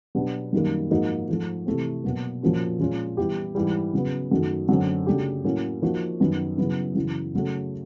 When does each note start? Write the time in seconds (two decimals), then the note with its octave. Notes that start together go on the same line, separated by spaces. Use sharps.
0.15 B2 F#3 B3 D4 G4
0.53 F#2 D#3 G3 A#3
0.90 G#2 F3 A#3 D#4 F#4
1.28 G#2 F3 A3
1.66 C3 E3 A3 C4
2.04 B2 F#3 A#3
2.43 A#2 F3 A#3 C#4 F#4
2.79 A#2 F3 G#3 C#4 F4
3.17 E3 G3 B3 E4 G4
3.55 G#2 E3 G3
3.93 C#3 F#3 B3
4.31 F#2 D#3 F#3 A3
4.69 F#2 D3 F#3 A3 C4
5.07 C#3 F#3 A3 D4 G4
5.44 A2 F#3 A#3 C#4
5.82 F3 A#3 D#4 F#4
6.20 F#2 D#3 F#3 B3
6.58 F#2 C#3 F#3 B3 E4
6.95 F#2 C#3 E3
7.34 C#3 F#3 A3